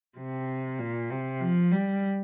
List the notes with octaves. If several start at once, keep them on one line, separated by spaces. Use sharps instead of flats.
C3
A#2
C3
F3
G3